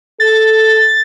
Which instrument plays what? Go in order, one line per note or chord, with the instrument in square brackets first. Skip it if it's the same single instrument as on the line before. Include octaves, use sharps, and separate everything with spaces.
[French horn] A4 [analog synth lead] A6